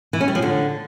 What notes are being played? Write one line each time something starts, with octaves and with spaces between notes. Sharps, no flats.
E3
C#4
G3
F3
D3